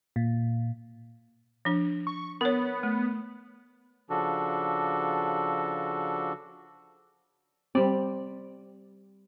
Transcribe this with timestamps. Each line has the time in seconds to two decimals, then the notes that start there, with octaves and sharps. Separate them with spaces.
0.16 A#2
1.65 F3 D4
2.07 C#6
2.41 B3 A#4 C#5
2.83 A3
4.10 C#3 F3 D4 F#4 A4
7.75 G3 C4 D5